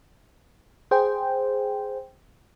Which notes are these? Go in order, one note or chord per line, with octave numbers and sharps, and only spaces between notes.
G#4 C5 G5